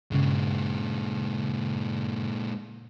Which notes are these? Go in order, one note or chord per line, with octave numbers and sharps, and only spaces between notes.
G2 A#2 C#3 G#3